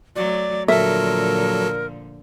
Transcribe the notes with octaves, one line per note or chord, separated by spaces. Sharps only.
F#3 A3 D5
A#2 D3 F3 F#3 A4 A#4 E5